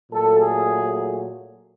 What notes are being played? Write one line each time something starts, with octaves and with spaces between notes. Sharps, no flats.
A#2 F#3 A3 A4
G#4